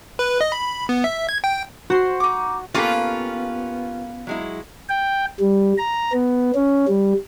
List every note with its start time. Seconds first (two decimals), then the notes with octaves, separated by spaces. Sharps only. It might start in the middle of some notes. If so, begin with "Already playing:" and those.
0.19 B4
0.41 D#5
0.52 B5
0.89 B3
1.04 E5
1.29 G#6
1.44 G5
1.90 F#4 C5 C6
2.20 D#4 D6
2.74 A#3 B3 C#4 F4 G4 A4 B4
4.27 F#3 G#3 E4
4.89 G5
5.40 G3
5.78 A#5
6.13 B3
6.55 C#4
6.88 G3